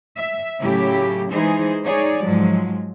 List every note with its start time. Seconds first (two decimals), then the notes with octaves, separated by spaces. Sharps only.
0.17 E5
0.61 A2 C#3 F#3 E4 G4
1.31 E3 G#3 D#4 G#4 C5
1.84 D#4 G#4 C#5 D5
2.22 G#2 F3 F#3 G#3